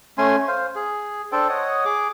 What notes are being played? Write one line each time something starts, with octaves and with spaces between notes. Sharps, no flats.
A3 C#4 G#5 C6
C5 F5
G#4
D4 A4 C5 G5
C#5 D#5 F#5 D#6
G#4 D6